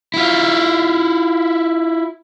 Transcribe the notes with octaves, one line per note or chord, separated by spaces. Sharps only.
E4 F4